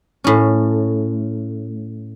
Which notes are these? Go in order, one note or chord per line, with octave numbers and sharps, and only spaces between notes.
A2 C#4